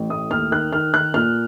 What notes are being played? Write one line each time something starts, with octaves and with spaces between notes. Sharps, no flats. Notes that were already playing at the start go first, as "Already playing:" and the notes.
Already playing: A1
A2 D#6
D#2 F6
D#3 F#6
D#3 F6
D#3 F#6
A#2 F6